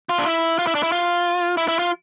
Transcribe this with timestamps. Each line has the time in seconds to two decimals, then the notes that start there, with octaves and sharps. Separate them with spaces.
0.09 F4
0.19 D4
0.26 E4
0.59 F4
0.67 E4
0.75 D4
0.83 E4
0.92 F4
1.57 E4
1.68 E4
1.79 F4